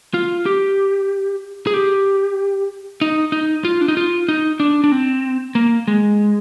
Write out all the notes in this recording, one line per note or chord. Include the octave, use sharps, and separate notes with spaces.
F4
G4
G#4
G4
D#4
D#4
F4
D4
D#4
F4
D#4
D4
D4
C4
A#3
G#3